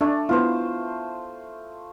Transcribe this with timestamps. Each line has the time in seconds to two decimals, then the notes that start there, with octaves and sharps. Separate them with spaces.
0.01 A3 D4
0.29 B3 E4 F4 C5